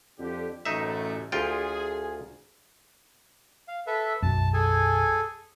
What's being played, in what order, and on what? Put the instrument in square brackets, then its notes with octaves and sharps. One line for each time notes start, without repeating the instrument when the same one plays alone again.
[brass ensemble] F2 D3 G4
[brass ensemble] A1 F#2 A3 [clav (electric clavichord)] D#4 E5
[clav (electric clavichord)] D2 F4 G5 [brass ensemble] G#4
[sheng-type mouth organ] F5
A4 B4 E5
[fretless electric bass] B1 F#2 [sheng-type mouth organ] A5
[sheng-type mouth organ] G#4 A4 G#5